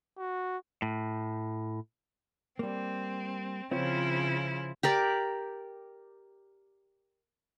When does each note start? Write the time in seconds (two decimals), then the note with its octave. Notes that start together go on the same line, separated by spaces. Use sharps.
0.18 F#4
0.82 A2
2.59 G3 A#3 C4
3.71 C#3 F3 C4 E4 F4 C#5
4.83 G4 A#4 D5